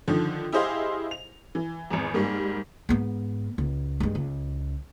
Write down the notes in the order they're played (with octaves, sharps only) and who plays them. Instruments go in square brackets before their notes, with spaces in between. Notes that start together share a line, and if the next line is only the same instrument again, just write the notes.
[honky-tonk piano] D3 D#3 F3
E4 G4 G#4 C5 D#5 F5
F7
E3
G#1 E2
G#2 G3 A#3
[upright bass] G#2 B3
C#2
G2 G#3
C#2